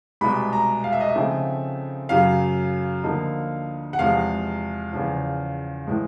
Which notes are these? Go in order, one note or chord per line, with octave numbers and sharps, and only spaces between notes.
C2 B2 G#3 B5
A#5
F5
E5
D#5
E5
C#3 F3 A3 C4 D#4
F#2 C#3 F#3 F5
D2 D3 F3 A#3 D#4
F#5
E2 C3 F3 G#3 F5
E2 C#3 F3
A2 E3 G#3